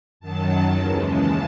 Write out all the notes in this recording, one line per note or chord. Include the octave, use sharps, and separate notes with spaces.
F#2 D#3 F#3 A5
D#2 C#3 E3 G#3
A5